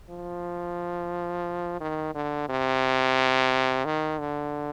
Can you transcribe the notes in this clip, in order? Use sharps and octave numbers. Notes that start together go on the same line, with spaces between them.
F3
D#3
D3
C3
D#3
D3